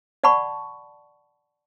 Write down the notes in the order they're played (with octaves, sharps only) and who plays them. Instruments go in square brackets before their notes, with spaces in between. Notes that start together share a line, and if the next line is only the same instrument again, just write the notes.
[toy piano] D5 F#5 A5 B5 C#6